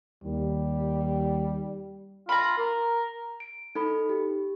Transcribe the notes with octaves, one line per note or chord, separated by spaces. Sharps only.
D#2 G3
F4 A#5 B5
A#4
D7
D#4 A4 B5
G4